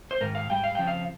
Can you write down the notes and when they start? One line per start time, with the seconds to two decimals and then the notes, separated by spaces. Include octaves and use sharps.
0.11 C5
0.21 G#2 D#3 A#4
0.35 F5
0.50 G#2 G3 G5
0.64 F5
0.75 F2 C#3 F3 G5
0.87 F5